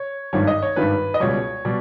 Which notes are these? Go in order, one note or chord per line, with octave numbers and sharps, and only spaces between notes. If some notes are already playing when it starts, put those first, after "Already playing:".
Already playing: C#5
G#1 G2 D#3 G3 C#5
D#5
C#5
G#1 G2 D#3 G3 B4
D#5
C#2 B2 G3 C#5
B2 G3